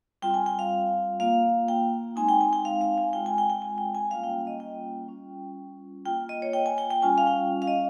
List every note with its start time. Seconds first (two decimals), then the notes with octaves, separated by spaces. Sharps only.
0.22 G3 C4 F4 G5
0.34 G#5
0.46 G5
0.59 F5
1.20 A#3 F4 F5
1.68 G5
2.16 G#3 C4 D#4 G#5
2.29 G5
2.41 G#5
2.53 G5
2.65 F5
2.81 F5
2.98 G#5
3.13 G#3 C4 F4 G5
3.26 G#5
3.38 G5
3.50 G5
3.62 G#5
3.78 G5
3.95 G#5
4.11 G3 A#3 C#4 F4 F5
4.24 G5
4.47 D#5
4.60 G5
5.08 G3 C#4 F4
6.06 A#3 F4 G5
6.29 D#5
6.42 C#5
6.53 G5
6.66 G#5
6.78 G5
6.90 G5
7.02 G3 C#4 F4 G#5
7.18 F5
7.27 G5
7.62 F5
7.68 D#5